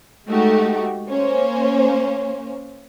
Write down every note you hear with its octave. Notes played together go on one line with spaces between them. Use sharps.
G#3 A3 D#4 F#4 G4
A#3 C#4 C5